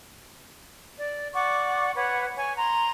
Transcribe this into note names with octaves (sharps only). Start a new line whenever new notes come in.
D5
D5 F#5 C#6 D6
B4 C#5 F#5
C#5 G#5 C#6
A#5 C6